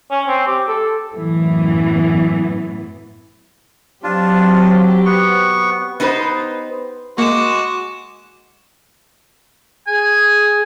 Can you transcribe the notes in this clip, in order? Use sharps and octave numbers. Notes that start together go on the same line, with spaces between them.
C#4
C4
G4
A4
F#2 A2 E3 B3
F#3 C4 D4 F4 G4
B3 C#6
B3 D#4 G4 B4 C5
G#3 A#3 F#4 C#6 D6 E7
G#4 G#5